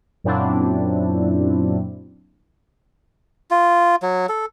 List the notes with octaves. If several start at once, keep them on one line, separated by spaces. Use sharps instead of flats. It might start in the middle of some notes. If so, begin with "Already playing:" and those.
F#2 A#2 F#3 C4 D4 E4
F4
F#3
A4